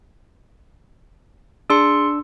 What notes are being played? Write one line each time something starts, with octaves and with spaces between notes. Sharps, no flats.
D4 G#4 C6 E6 C#7